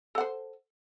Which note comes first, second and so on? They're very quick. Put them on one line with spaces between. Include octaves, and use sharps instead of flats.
A4 F#5 C5